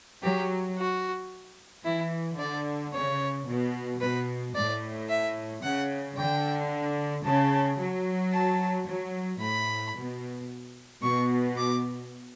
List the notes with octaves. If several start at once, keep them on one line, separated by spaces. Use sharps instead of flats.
F#3 G4
F#4
E3 E4
D3 D5
C#3 C#5
B2
B2 B4
A2 D5
E5
C#3 F#5
D3 G5
C#3 A5
F#3
A5
F#3
A2 B5
B2
B2 C#6
D6